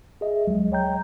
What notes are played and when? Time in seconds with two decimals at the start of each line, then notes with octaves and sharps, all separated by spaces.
0.21 G#4 D#5 E5
0.47 D2 F#3 G#3
0.72 C#5 D#5 G5 A#5 G6